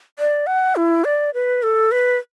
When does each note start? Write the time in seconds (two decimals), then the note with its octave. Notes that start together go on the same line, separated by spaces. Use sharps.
0.19 D5
0.47 F#5
0.76 E4
1.04 D5
1.34 B4
1.63 A4
1.92 B4